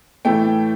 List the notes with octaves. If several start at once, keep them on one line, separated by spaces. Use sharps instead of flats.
A2 E3 A3 G5